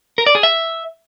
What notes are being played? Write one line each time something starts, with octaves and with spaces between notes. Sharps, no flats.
A#4
D5
G#4
E5